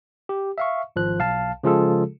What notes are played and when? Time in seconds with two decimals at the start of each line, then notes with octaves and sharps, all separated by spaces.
0.29 G4
0.58 E5 F5 C#6
0.96 G#1 F3 F#6
1.19 B1 F5 A5
1.63 C#3 F3 G#3 F4 G#4 A4